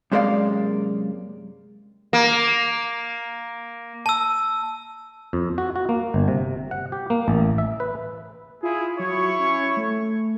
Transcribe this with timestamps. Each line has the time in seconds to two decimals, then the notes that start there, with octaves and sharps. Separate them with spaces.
0.12 F#2 C3 G#3 A#3 D5 F5
2.13 A#3
4.06 A5 E6
5.33 F2
5.58 F#4
5.76 F#4
5.89 A#3
6.14 G1
6.28 C3
6.71 F#5
6.92 G4
7.10 A#3
7.28 A1
7.58 E5
7.80 B4
8.63 E4 F4 G#4
9.00 F#3 E4 C#5 C#6
9.39 C#4
9.77 A3